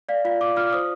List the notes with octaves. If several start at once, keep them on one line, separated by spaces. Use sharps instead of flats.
D5 F5
F4 F5
F4 D6
F4 F6
C5 D#6